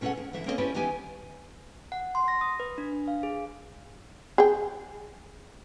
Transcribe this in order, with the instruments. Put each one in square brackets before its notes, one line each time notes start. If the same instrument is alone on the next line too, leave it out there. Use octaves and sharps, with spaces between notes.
[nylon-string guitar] B2 C#4 F4 G#4 A4 F#5
D#2
D2 E3 E5
A#3 C4 C#4 E4 A4 D#5
C#4 E4 G4 B4 C5 D5
D#3 E3 B3 G4 G#5
[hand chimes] F#5
C6
A#6
D#6
B4
D4
F5
G#4
[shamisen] G#4 G5